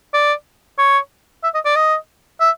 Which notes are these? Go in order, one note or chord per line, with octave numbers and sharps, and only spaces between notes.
D5
C#5
E5
D#5
D5
D#5
E5